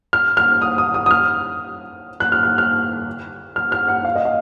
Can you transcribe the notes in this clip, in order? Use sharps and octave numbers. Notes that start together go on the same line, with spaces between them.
F6
F6
D#6
D#6
D#6
D#6
F6
F#6
F6
F#6
F6
F6
F6
F#5
F5
D#5
F5